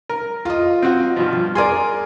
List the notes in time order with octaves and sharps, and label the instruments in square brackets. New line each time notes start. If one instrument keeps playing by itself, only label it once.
[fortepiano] A#4
[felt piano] F4 D#5
[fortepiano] C4 F#4
G2 B2 F3
[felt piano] G#4 A#4 [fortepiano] D5 G#5 C6